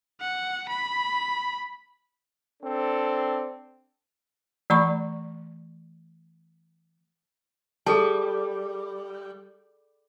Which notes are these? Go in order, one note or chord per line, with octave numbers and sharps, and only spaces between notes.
F#5
B5
C4 D4 A4
E3 A3 D5 A#5 B5 C#6
G3 G#4 A4 A5